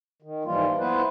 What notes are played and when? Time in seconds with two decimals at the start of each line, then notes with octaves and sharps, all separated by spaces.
0.22 D#3
0.45 G#2 E3 F3 G3 A#3 F4
0.78 B3 E4 B4 C5